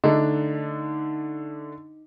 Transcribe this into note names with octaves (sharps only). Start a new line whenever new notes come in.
D3 A3 D4 D#4